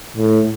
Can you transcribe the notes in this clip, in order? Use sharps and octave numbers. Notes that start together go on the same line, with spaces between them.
A2